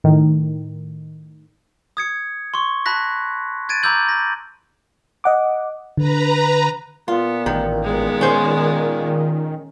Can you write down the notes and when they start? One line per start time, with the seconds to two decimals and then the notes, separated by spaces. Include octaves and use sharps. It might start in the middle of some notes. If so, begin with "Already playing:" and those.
0.04 A2 D#3
1.97 D#6 G#6 C#7
2.54 C6 C#6
2.85 A5 B5 F#6 A#6 B6
3.69 F#6 G#6 A6 D7 D#7
3.83 A#5 B5 D6 E6 G6 F#7
4.09 A#6
5.24 D#5 F#5 D6
5.97 D3 B4 A#5
7.08 A#2 B3 F4
7.46 A1 D#3
7.83 G#3 B3
8.21 D#3 C#4 C5